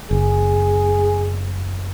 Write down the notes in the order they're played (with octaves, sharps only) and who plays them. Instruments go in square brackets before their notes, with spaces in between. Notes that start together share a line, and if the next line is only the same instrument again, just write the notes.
[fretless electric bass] F#1 [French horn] G#4